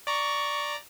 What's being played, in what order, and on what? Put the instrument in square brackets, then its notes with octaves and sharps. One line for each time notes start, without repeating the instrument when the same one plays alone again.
[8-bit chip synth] D5 A#5 [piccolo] C#6